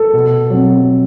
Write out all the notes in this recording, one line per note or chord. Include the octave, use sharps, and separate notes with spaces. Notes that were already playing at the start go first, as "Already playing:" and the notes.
Already playing: A4
B2
F#3 C4